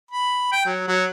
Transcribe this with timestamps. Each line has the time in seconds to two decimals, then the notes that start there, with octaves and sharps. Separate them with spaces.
0.11 B5
0.52 G5
0.66 F#3
0.88 F#3